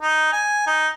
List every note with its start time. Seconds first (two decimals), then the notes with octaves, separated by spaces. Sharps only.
0.01 D#4
0.33 G#5
0.67 D#4